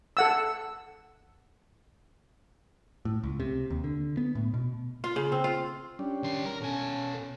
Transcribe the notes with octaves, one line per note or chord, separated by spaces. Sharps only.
A4 F#5 E6
A2
C#2
C3
D#2
D3
B3
A2
B2
F4
C#3
C4
F4
G3 C#4 D4
D#3 C6
A#4 A#5
B2 C#4 A4 G#5